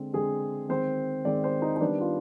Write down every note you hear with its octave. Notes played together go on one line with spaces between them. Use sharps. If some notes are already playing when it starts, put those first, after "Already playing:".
Already playing: D3 G#3 C4
D3 G#3 C4 G#4
D#3 G#3 C4 C5
D#3 G#3 C4 D5
C5
D#4
D#4
D#3 G3 B3 D4
F4